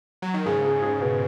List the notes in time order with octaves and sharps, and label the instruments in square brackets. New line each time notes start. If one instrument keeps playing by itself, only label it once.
[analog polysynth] F#3
D#3
[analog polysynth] G#2 C#3 [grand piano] G#4
[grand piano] G#4
G#4
B2